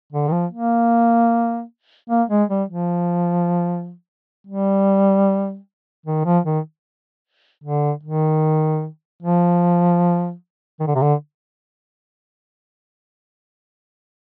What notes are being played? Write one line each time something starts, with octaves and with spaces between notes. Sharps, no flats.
D3
D#3
F3
A#3
A#3
G#3
G3
F3
G3
D#3
F3
D#3
D3
D#3
F3
D#3
D3
C3
D3